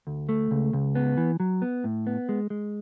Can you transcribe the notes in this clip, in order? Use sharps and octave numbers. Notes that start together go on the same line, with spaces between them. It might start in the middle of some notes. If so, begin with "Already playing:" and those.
D2
A3
C#2
C#2
B3
E3
F#3
B3
A2
B3
G#3
G#3